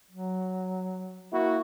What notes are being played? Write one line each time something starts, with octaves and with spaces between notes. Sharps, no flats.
F#3
A#3 E4 F#4